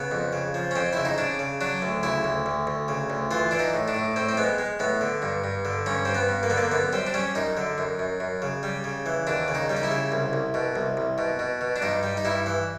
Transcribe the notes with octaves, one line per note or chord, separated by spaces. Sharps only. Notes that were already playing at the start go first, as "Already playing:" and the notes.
Already playing: C#3 B3
F2
C#3
F3
C#4
F2 C4
C#3 E4
D#4
C#3 D4
C#3
F#3 D4
D2
C#3 E4
D2
D2
D2
C#3
D2
E3 F4
E3 D4
D#4
A2
D4
A2
A2 C4
C4
G#3 B3
G#3
A2 B3
D3
G2
G2
D3
G2 C#4
G2 C4
B3
G2
A#3
D3 B3
A#3
F#2 B3
G3 C4
D4
G3 C#4
F#2 D#4
D3
F#2
F#2
F#2
C#3
G3
C#3
E3
D#2 D4
C#3
D#4
G3
D#4
E4
C#3
C2
C2
B2
C2
C2
B2
B2
B2
D4
G2 D#4
G3
D#4
G2 E4
E3